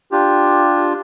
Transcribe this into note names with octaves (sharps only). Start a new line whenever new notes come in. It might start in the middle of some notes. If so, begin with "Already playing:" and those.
D4 F4 G4